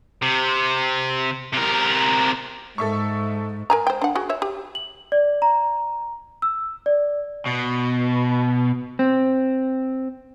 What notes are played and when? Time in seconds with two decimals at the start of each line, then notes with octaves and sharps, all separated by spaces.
0.22 C3
1.53 C3 A#4
2.78 G#2 A4 E5 C#6
3.70 A#4 G#5 A#5
3.87 C5 G5
4.02 D4 F#5
4.15 F#4 G#4
4.29 C#5 E5
4.42 G4
4.75 F#7
5.12 D5
5.42 A#5
6.42 E6
6.86 D5
7.46 B2
8.99 C4